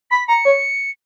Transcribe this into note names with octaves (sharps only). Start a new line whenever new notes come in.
B5 B6
A#5 C#7
C#5